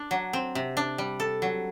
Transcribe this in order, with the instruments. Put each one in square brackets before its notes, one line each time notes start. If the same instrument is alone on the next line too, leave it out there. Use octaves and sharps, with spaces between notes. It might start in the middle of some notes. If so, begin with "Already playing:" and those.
Already playing: [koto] D4
F#3
C4
C3
D4
G3
A4
F#3